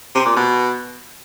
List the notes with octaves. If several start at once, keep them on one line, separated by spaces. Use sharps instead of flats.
C3
A#2
B2